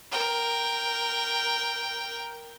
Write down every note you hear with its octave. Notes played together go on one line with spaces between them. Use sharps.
A#4 G5